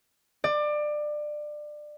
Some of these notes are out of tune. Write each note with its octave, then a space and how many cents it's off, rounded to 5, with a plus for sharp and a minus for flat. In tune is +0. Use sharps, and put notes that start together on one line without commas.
D5 +25